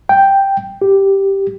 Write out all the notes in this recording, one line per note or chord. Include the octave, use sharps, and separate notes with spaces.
G5
G4